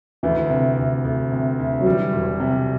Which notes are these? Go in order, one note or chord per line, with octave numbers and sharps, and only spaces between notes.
D2 E3
C3
D2
D2
C3
D2
F#3
E3 G3
E1
C3